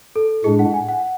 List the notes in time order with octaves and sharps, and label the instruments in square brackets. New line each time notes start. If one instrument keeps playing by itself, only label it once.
[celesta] A4
[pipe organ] A2 G#3 D4 [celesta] G#4
[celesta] F#5
G#5
F#5